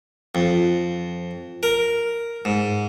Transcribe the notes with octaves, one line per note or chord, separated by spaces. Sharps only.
F2
A#4
G#2